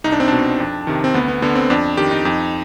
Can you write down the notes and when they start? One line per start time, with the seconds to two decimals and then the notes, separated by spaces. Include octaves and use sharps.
0.04 C2 D#4
0.12 D4
0.20 C4
0.28 B2 D4
0.60 F2
0.87 C3 D#3
1.04 C4
1.14 D2 B3
1.28 B3
1.42 D3 B3
1.55 C4
1.70 F2 D4
1.97 D#3 G4
2.11 D#4
2.25 F2